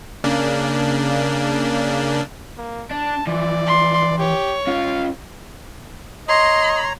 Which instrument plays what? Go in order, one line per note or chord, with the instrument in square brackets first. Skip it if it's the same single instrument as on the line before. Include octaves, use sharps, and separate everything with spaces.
[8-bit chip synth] C#3 A#3 D4
[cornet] A#3
[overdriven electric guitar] D4 [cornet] A5
[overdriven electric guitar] E3 F3 [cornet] D5
[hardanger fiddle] C6
[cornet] G4 [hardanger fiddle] C#5
[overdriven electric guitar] C#4 F4 [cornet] F5
[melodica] C#5 A#5 [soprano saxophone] D#5 [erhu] C6